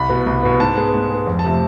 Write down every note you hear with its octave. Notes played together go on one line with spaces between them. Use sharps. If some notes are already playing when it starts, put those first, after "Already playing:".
Already playing: C2 B5
B2 B3
C2
B2 B3
G#2 A5
G#3 B3
G#2
G#3 B3
F2
A5
C3 F3 A3